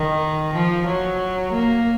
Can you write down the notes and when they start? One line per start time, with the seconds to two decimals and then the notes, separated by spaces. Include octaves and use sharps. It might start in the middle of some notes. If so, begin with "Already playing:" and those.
Already playing: D#3
0.54 F3
0.87 F#3
1.53 A#3